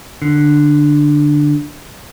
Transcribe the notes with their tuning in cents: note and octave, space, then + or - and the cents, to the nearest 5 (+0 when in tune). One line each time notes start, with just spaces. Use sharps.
D3 +10